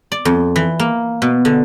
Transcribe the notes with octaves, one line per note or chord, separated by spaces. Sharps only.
D5
F2
E3
A#3
B2
D3